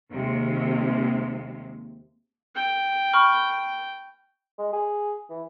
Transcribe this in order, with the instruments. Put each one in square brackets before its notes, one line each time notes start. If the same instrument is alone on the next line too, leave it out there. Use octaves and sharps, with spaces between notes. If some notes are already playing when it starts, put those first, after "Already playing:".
[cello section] D#2 C3 G#3
[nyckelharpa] G5
[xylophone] B5 C#6 F6
[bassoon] G#3
G#4
E3